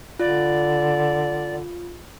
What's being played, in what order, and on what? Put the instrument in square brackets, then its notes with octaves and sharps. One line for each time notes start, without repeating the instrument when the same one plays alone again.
[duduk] D3 [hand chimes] F4 [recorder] D5